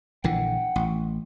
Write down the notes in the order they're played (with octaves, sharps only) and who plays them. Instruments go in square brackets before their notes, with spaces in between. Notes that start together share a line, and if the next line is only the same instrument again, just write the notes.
[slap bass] A#1 D3 E3 [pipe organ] F#5 G5
[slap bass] A1